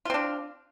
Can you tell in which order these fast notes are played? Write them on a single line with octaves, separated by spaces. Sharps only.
F4 C4 D4